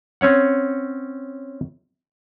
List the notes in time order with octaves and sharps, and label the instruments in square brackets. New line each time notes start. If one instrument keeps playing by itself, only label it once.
[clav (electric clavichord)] C4 C#4 C#5 F#5